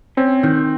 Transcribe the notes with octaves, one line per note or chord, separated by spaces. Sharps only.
C4 C#4
D#3